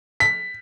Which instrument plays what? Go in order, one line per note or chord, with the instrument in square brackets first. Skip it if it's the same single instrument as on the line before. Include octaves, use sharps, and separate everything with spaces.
[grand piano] B6